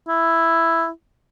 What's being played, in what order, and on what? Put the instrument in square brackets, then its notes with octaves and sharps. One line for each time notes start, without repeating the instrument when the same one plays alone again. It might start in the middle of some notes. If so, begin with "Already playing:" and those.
[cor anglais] E4